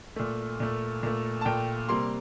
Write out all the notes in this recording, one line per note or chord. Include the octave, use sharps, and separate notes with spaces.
A#2 A3
A#2 A3
A#2 A3
A5
A#2 A3 G5
C3 G3 A#3 C6